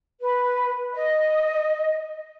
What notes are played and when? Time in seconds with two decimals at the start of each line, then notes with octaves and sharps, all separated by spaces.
0.21 B4
0.94 D#5